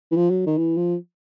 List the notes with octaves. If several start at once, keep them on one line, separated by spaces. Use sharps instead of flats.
E3
F3
F#3
D#3
E3
F3